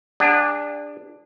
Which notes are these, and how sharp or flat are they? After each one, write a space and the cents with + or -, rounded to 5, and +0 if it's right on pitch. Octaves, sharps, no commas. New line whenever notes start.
D4 +5 G#4 -35 F#5 +0